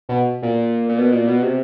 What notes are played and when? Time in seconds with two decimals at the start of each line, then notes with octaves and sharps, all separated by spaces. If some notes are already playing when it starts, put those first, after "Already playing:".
0.09 B2
0.42 A#2
0.89 A#2
0.98 B2
1.12 A#2
1.27 B2
1.43 C3